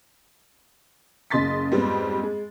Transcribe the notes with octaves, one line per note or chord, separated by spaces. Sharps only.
F#1 C#3 D#5 C6 A6 B6
F2 G#2 G3 B3 C4
G#3